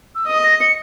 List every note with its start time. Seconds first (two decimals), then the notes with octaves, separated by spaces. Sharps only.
0.15 E6
0.27 D#5 D#6
0.43 A#6
0.61 C#7